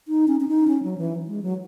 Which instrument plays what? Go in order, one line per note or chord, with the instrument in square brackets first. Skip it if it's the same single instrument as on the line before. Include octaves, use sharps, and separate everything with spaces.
[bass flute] D#4
C#4
C#4
D#4
C#4
F#3
E3
G#3
F#3